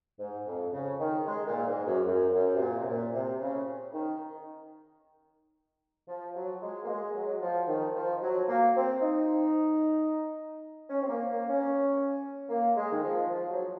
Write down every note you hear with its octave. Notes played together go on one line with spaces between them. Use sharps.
G#2
F2
C#3
D#3
G#3
A#2
G#2
F#2
F#2
F#2
C3
A#2
C3
A#2
C3
C#3
D#3
F3
F#3
G#3
A#3
G#3
F#3
F3
D#3
F3
F#3
A#3
C4
D#4
C#4
C4
A#3
A#3
C#4
A#3
G#3
D#3
F3
F3
F#3